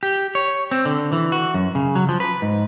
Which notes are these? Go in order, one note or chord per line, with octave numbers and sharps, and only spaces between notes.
G4
C#5
C4
D3
E3
F#4
F#2
C#3
F#3
F3
B4
G#2